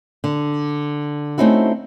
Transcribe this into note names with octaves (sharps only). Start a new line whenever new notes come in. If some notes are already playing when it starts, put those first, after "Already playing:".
D3
A3 C4 C#4 D#4 E4 F#4